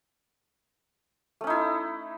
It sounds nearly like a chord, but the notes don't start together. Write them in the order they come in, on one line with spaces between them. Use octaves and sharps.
A3 C#4 D#4 E4